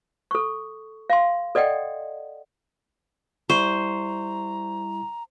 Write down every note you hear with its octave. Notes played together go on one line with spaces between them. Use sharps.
A4 C#6
F5 C6
A4 D5 D#5 F#5 G5
G3 E4 C5 A#5 C#6